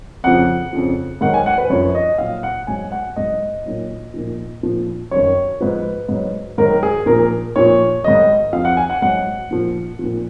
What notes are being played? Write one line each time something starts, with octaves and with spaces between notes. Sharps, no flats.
F2 C#3 F3 F#5
F2 C#3 F3
G#2 D#3 F#3 F#5
G#5
F#5
B4
F#2 F3 C#5
D#5
A#2 F#3 F5
F#5
G#2 F#3 G#5
F#5
G#2 F#3 D#5
A#2 F#3
A#2 F3
A#2 F3
F#2 D#3 F#3 C#5
G#2 F3 B4
G#2 F#3
G#2 D#3 F#3 A#4
G#4
A#2 F3 A#4
A#2 F3 C#5
G#2 D#3 F#3 D#5
F2 F3 F5
F#5
G#5
F#5
G#2 F#3 F#5
A#2 F3
A#2 F3